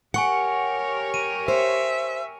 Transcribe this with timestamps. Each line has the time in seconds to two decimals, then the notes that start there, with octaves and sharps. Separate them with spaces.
0.14 G4 A#4 C#5 F#5 G#5 C#6 C#7
1.14 D#7
1.48 C5 E5